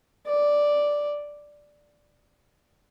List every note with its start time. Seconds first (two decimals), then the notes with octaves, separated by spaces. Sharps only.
0.27 D5